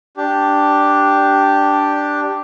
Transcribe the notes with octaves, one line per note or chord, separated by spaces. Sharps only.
D4 G4